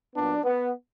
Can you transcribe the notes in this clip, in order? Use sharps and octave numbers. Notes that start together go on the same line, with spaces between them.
A#2 F#3 B3 D4
B3